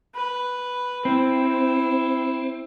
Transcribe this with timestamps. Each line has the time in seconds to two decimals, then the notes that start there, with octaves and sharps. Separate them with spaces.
0.15 B4
1.05 C4 E4